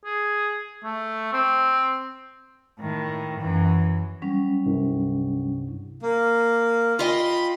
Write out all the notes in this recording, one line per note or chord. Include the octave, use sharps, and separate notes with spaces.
G#4
A3
C4
A2 D#3
F#2 E3
F#3 G3 C#4
C2 G2
A#3
F4 D#5 G5 B5 C6